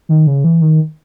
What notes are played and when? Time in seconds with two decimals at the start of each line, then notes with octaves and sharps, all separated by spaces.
0.09 D#3
0.27 C#3
0.44 E3
0.61 D#3